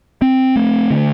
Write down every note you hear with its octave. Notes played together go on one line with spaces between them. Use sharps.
C4
A3
D3